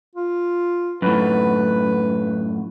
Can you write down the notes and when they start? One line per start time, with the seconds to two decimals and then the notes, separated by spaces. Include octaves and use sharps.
0.15 F4
1.02 F#2 A2 B4